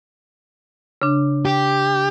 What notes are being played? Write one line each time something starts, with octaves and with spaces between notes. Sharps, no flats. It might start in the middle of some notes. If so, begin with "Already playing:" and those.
C#3 D4
G4